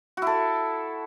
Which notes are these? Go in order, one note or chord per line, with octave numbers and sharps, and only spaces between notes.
E4 F#4 A4